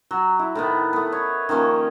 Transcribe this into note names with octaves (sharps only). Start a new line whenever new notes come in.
F#3
E4
A2 D#3 B3
A3 B3
C#5
D#3 F3 A#3 C#4